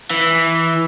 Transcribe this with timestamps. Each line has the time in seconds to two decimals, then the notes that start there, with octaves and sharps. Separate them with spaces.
0.10 E3